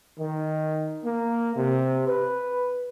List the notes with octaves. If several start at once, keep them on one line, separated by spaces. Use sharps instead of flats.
D#3
A#3
C3
B4